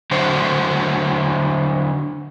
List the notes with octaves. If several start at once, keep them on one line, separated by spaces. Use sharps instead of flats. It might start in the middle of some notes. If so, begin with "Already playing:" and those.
D3 F#3 F#4 C5